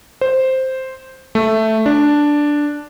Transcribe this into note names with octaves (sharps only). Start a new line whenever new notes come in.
C5
A3
D4